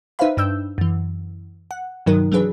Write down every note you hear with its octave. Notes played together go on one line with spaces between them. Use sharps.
D#4 B4 C5 E5 F5 B5
G2 D4 E6 G6
F#2 E3
F#5
G2 C3 D#3 F#3 D#4 A#4
E3 F#3 D4 G#4 B4